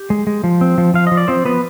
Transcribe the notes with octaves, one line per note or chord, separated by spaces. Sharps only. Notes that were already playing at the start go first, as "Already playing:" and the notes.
Already playing: G4
G#3
G#3
F3
C4
F3
F3 F5
F3 D#5
D5
F3 C4 C5
F3 B3 B4